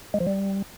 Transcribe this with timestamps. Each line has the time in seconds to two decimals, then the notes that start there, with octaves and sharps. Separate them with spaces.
0.14 G#3
0.20 F3
0.27 G3